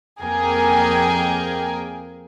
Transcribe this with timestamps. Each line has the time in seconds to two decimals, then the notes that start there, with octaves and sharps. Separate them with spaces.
0.21 F2 A#3 G#4 A#4 G5 G#5